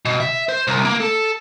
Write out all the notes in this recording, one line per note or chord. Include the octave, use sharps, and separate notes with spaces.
B2
E5
C5
C2
A#3
A4